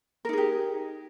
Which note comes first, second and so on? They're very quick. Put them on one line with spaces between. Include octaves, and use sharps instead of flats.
A#4 D#4 G#4 G4